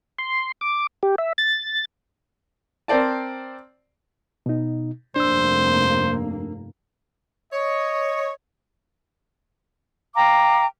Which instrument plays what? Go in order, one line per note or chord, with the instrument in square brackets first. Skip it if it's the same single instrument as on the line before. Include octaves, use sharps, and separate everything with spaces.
[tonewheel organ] C6
D6
G4
E5
A6
[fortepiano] C4 A#4 C5 D5 A5
[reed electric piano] B2 D#4
[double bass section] F1 G2 A#3 [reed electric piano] D4 E6 [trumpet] C5
[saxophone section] C#5 [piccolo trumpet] D#5
[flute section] F5 G5 A#5 D6